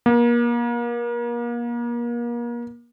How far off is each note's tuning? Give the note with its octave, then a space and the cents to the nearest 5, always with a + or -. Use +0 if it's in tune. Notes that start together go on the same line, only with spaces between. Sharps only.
A#3 +35